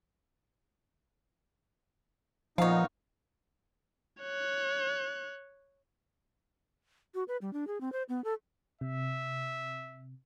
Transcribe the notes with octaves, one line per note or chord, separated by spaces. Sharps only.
A#2 F3 B3 D#4 C#5 F5
C#5 F#6
F#4
B4
G3
D4
G#4
C4
C5
B3
A4
C3 E5